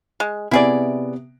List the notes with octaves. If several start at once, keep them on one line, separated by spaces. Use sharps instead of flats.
G#3
C3 B3 E4 G#4 D5 D7